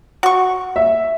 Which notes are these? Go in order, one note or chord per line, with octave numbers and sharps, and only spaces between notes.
F#4 C#6
E5